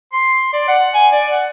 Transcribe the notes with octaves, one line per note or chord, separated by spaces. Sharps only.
C6
D5
F#5
G#5
D5
F#5